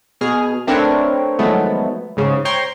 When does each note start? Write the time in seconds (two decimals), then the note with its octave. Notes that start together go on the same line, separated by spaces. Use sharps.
0.21 B2 G#4 F6
0.67 A3 C4 D4 A#4 B4 C#5
1.39 D#3 F3 F#3 G#3 A3 B3
2.17 G#2 C#3
2.45 C5 C#5 G5 A#5 C6 C#6